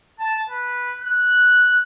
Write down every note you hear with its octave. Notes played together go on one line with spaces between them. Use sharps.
A5
B4
F#6